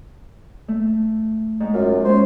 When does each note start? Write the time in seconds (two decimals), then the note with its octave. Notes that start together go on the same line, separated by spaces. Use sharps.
0.68 A3
1.60 G#2 G#3
1.74 F#2 F4
2.05 G#3 C#4 C5